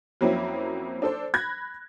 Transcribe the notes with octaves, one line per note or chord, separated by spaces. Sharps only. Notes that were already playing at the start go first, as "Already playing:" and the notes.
F2 F#3 A#3 C4 C#4 E4
D4 A4 C5
B5 F#6 G#6 A#6